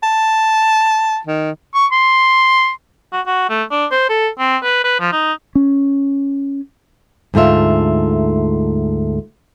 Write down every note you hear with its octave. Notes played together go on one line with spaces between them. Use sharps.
A5
D#3
C#6
C6
F#4
F#4
A3
D4
C5
A4
C4
B4
B4
F3
D#4
C#4
D2 G#2 A3 F4 E5